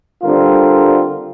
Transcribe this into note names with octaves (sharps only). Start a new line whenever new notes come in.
D3 G3 C4 F4 A#4